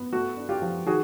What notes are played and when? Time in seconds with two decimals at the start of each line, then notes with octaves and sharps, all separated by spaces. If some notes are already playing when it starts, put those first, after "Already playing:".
Already playing: B3
0.13 A3 F#4
0.37 D4
0.49 F4 G4
0.62 F3
0.86 D#3 F#4 G#4